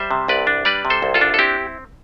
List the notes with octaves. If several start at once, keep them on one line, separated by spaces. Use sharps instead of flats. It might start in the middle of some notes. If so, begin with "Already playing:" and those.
Already playing: G3 C5 E5
C3
C2 B4 D5
D4
G3 B4 D5
C3
A4 C5
C2
F4 A4
D4
A4
C4 E4 G4